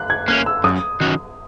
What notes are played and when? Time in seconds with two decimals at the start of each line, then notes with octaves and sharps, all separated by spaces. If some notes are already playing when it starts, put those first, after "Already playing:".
Already playing: F#6
0.10 G#6
0.28 A#3 C#4 F#6
0.46 E6
0.64 F#2 D#6
1.00 D#3 F#3 C#4 F#4